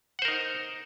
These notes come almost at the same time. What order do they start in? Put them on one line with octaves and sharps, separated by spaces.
F#5 C5 A#4 D#4